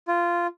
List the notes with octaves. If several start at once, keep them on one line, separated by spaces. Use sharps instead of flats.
F4